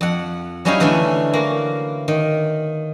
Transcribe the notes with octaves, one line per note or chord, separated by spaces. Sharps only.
F2 F#5
F#3 G3 C#4 D#4 E4 F5
D3 E3 A3 C#4 E4
A#3 F#4
D#3